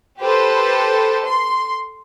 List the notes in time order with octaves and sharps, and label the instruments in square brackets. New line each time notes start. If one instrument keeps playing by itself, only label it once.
[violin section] G4 A4 B4 C5
C6